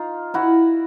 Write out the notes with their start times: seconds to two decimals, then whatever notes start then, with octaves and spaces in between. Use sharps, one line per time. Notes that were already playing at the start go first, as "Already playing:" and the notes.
Already playing: D#4 F4
0.34 E4 F#4